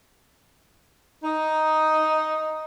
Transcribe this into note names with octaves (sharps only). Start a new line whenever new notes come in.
D#4